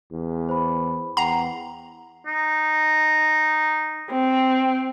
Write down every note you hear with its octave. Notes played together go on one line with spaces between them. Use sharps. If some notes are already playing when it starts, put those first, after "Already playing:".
E2
C5 B5
E2 F#5 G5 A#5 C7
D#4
C4